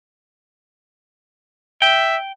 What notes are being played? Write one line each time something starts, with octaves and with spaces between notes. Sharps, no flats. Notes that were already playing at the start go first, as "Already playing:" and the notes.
E5 G5